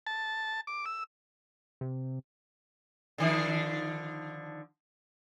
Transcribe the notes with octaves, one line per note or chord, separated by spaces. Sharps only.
A5
D6
E6
C3
D3 D#3 F3